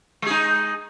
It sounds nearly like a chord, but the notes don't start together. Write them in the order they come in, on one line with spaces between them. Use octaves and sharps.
G#3 G#4 D#4